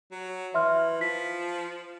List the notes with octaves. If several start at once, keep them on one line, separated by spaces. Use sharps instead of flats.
F#3
E3 E5 C6 F6
F3 B6